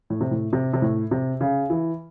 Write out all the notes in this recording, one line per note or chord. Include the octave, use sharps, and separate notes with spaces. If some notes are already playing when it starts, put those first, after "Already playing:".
A2
C3
A2
C3
C3
A2
C3
C#3
E3